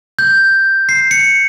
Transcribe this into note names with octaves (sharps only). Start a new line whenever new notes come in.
G6
C7
C#7